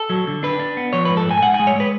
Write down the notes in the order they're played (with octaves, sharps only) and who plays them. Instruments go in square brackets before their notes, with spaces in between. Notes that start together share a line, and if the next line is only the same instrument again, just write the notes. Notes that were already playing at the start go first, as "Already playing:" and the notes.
Already playing: [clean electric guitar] A4
F#3
D3
D4 B4
D4
B3
F3 C#5
G#2 B4
A4
G#2 G#5
G#5
G#2 F#5
G#5
G#3
C#5
G#3 B4